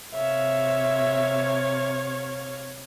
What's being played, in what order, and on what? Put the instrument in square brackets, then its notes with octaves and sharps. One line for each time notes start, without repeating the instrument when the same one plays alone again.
[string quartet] C3 C#5 F5 [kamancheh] E5